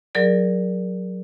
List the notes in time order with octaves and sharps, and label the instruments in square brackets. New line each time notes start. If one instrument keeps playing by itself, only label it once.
[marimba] F#3 G#4 A#4 D5